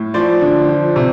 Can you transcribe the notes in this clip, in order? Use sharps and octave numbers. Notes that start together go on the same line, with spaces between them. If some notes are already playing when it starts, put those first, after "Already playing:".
Already playing: A2
F3 C5 D5
D3
F3
C3